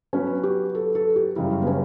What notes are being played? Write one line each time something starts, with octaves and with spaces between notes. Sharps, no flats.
F#3 B3 C#4 F#4 B4
G4
A4
A4
G4
F#2 C#3 G3 E4
B3
C#4